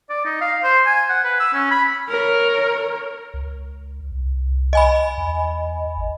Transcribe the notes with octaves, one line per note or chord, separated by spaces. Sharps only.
D5
D#4
F5
C5
G#5
F#5
B4
E6
C#4
B5
A#4 C#5
C#2
C2
D#5 G#5 B5
E2
G#1